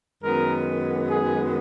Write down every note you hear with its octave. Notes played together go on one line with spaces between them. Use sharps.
F#2 D#3 G#3 B3 A#4
G#4